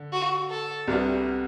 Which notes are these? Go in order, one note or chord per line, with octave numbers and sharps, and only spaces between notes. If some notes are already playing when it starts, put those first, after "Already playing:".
Already playing: D3
F#4
A4
C2 C3 G3 B3 F#4